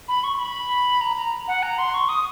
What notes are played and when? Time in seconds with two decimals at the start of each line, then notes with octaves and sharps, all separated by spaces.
0.08 B5
0.24 C#6
0.39 B5
1.01 A#5
1.17 A#5
1.48 F#5
1.63 A#5
1.78 C6
1.94 C#6
2.09 D#6